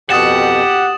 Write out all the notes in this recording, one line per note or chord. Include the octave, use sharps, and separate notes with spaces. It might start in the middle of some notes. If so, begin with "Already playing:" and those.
F2 B2 G4 F#5 D#6 A6 E7